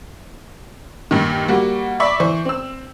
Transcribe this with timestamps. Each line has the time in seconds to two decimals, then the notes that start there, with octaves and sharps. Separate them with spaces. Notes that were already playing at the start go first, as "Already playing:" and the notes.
1.11 G2 A#2 D#3
1.48 G3 A#3 F#4
2.00 D5 E5 B5 C#6 D6
2.20 E3 C5 C#6
2.45 C4 E6